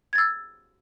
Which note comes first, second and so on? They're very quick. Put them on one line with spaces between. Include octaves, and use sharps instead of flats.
G#6 A6 E6